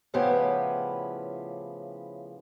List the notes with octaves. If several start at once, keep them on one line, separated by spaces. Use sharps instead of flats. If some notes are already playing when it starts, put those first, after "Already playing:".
A2 C#3 F3 B3 E4 G4